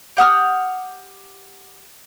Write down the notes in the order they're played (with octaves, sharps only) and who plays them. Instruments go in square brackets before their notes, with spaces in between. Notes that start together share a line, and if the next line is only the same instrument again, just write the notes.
[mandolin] G4 F#5 D#6 F6